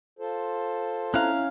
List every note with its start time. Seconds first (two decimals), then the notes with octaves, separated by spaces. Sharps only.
0.19 F4 A4 C5
1.14 C#4 E4 F5 A#5 F#6